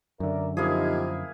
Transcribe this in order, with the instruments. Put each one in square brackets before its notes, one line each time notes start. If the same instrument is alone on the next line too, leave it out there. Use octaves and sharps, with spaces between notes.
[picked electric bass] F#2 D3 [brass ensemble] A#4 D5 E5
[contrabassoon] F3 [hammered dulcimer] A#3 E4 G#4 [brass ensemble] C4 D#4 G4